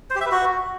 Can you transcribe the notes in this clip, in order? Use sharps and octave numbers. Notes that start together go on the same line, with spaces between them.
C5
G4
E5
B4
F#4